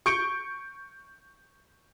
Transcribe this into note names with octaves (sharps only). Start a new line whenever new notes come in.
C#6 G6 C#7 D7